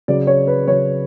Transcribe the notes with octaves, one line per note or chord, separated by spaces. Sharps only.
C#3 F#3 D5
C#5
B4
C#3 F#3 C#5